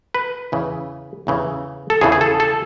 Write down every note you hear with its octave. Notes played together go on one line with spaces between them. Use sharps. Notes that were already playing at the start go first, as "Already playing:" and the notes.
B4
E2 C#3 E3
E2 C#3 E3
A4
E2 C#3 E3 G#4
G#4
A4
A4